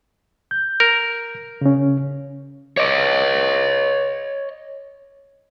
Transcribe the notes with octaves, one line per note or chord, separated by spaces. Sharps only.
G6
A#4
C#3 C#4
C#5 D#5